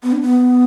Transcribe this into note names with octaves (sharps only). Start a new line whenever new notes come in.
B3
D4
B3